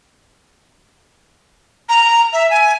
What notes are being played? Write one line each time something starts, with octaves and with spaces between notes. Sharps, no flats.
A#5
E5
G#5